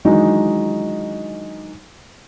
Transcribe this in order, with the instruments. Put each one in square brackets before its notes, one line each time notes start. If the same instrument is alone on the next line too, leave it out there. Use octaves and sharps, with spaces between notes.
[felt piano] D#3 E3 F#3 G#3 D4 D#4